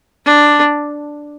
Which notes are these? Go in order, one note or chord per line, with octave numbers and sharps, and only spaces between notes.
D4